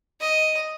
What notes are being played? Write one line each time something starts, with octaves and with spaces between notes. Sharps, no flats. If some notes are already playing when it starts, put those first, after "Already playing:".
D#5